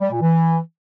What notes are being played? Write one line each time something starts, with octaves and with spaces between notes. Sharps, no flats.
G3
A#2
E3